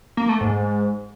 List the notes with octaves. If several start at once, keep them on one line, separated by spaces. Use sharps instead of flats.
A#3
A3
G#2